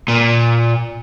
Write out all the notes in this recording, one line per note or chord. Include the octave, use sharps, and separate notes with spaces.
A#2